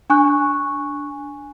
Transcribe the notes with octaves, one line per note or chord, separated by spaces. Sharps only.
D4 G#5 C#6 F#6